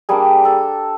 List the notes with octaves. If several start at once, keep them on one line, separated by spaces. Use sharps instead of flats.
G3 A#3 D4 G#4
A4